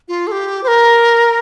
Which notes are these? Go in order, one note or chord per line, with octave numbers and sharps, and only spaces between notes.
F4
A4
G4
C5
A#4